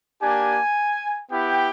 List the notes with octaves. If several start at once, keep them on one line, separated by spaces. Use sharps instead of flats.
A#3 D4 G4 G#5
B3 E4 G4 G5